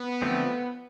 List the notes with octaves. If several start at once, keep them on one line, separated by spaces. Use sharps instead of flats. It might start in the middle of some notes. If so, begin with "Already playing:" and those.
Already playing: B3
D3 F3 A3 C4